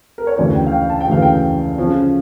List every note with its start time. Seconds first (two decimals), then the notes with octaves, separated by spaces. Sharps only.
0.18 A#4
0.27 C#5
0.37 D2 C#3 E3 D5
0.55 G5
0.66 F5
0.72 G5
0.90 A5
1.01 G5
1.08 D2 C#3 E3 F5
1.22 G5
1.78 C#3 F3 C#4